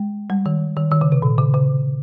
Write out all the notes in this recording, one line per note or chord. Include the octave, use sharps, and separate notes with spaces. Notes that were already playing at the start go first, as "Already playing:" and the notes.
Already playing: G#3
G3
D#3
D#3
D#3
C#3
C3
A#2
C#3
C#3